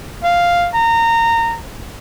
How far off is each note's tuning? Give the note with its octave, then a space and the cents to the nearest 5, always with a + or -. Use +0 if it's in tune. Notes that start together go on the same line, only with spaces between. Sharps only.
F5 +0
A#5 -20